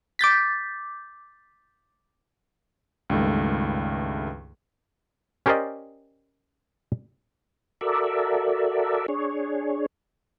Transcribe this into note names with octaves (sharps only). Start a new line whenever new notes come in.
D6 G6 A6 B6
C#2 G2 D#3 A3
C#4 G4 A#4 C5 D5 D#5
F#4 A4 A#4 D5 E5
D4 G#4 C#5